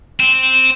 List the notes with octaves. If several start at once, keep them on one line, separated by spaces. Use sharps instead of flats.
C4